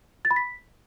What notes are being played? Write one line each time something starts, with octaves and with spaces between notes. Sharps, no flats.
A6
B5
B6